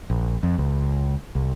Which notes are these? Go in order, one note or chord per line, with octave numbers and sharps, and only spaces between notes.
A#1
F2
C#2
C2